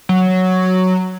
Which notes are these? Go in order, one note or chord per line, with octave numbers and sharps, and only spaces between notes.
F#3